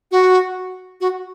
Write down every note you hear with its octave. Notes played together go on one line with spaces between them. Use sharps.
F#4
F#4